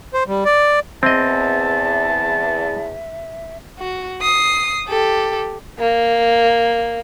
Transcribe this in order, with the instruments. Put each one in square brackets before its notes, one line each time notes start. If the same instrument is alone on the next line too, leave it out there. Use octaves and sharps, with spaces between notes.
[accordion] C5
G3
D5
[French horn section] E2 [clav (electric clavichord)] C4 D#5 [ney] E5 [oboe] A5
[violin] F#4
D#6 C7
G4 A4
[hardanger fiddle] A#3